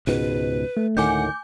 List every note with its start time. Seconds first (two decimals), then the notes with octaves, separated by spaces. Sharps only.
0.07 C#2 G#2 B2 B4
0.77 A3
0.97 D2 A2 D#3 F#5 G#5 D6 G6